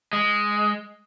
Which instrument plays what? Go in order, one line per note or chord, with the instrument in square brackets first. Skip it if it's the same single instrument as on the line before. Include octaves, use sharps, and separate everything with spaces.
[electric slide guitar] G#3